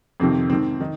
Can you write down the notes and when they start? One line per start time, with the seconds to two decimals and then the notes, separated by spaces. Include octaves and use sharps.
0.20 F2 C3 D#3 C4
0.50 G#2 D#3 C4
0.80 D#3 D#4